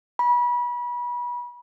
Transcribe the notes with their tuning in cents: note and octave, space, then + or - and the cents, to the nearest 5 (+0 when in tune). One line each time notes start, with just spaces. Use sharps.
B5 -30